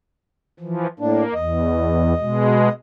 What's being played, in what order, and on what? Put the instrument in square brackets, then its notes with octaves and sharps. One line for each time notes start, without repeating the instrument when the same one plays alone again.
[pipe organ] E3 F3
[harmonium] A2 D4 [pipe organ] A#3
[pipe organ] E2 [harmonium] D#5
[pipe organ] B2 G#3